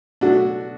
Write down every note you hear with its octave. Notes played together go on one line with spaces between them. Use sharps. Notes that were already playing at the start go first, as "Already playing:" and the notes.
B2 F#3 A3 D4 F#4